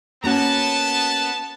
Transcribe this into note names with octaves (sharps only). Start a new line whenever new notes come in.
A#3 B3 C#4 F#4 A5